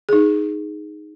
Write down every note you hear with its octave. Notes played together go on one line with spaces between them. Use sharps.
D#4 G#4